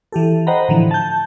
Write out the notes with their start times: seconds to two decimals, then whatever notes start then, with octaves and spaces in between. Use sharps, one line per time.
0.12 E3 G4 A4
0.47 C5 D#5 F#5 G5 A#5 B5
0.69 A2 D3 E3 F3
0.91 A5 G6